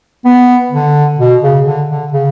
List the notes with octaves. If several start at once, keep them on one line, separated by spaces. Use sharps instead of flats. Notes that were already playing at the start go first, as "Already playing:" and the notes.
B3
D3
B2
C#3
D3
D3
C#3